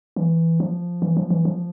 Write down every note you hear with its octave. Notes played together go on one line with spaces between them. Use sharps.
E3
F3
E3
F3
E3
F3